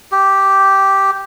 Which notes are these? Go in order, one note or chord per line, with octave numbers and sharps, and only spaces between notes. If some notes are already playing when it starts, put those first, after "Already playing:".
G4